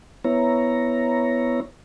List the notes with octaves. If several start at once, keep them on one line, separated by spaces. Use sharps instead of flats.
B3 E4 C#5 A#5